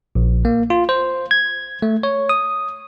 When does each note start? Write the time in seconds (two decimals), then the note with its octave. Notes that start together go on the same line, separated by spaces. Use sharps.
0.15 A#1
0.45 A#3
0.70 F4
0.89 C5
1.31 G#6
1.82 A3
2.03 C#5
2.29 D#6